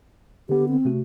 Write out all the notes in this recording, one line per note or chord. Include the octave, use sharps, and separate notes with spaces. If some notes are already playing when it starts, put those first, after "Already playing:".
D3 B3 G4
C4
C3 A3 F#4